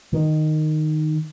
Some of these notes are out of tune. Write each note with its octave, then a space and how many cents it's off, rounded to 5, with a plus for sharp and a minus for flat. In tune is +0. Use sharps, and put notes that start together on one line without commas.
D#3 -10